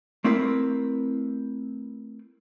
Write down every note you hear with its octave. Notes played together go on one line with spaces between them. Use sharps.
A3 C4 E4 A#4 B4